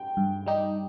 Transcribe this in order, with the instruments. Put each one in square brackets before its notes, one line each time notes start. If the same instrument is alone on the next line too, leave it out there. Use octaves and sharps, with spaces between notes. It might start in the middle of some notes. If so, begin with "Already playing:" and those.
Already playing: [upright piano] G5
[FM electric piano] G2
G3 D#4 G4